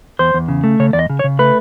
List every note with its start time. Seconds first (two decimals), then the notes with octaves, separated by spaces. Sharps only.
0.19 E2 C5
0.34 E2
0.48 C#3
0.64 A3
0.80 C#3 C#5
0.93 E2 D5
0.99 D#5
1.10 C#3
1.19 C#5
1.24 C#3
1.39 A3 B4